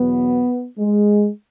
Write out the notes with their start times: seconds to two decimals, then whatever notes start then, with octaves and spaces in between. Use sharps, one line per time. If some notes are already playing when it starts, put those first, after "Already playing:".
Already playing: E2 B2 F#3 B3
0.79 G#3